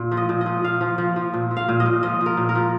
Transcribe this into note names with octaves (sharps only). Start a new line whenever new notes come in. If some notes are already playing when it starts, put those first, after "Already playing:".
Already playing: A#2
F3
D#5
A#2
D#5
F3
A#2 F5
F3
F3
F3
A#2
F3
F5
A#2
D#5
A#2
F3 D#5
F3
A#4
A#2
A#4
F3